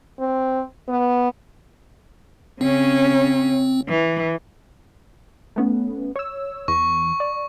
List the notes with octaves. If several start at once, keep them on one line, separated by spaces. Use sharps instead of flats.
C4
B3
C#3 C4 C#4
E3
A3 B3 C#4
C#5 E6
E2 C#6
D5